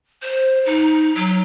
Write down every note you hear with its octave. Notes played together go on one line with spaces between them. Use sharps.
C5
D#4
F#3